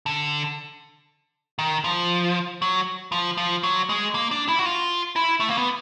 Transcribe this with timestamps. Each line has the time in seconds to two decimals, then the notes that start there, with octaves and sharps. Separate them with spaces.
0.06 D3
1.59 D#3
1.84 F3
2.62 F#3
3.12 F3
3.37 F3
3.63 F#3
3.89 G#3
4.15 A#3
4.31 D4
4.48 E4
4.59 F#4
4.66 F4
5.16 E4
5.40 A3
5.49 A#3
5.58 B3